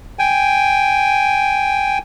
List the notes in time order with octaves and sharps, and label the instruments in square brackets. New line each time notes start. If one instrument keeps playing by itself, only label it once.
[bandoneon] G5 G#5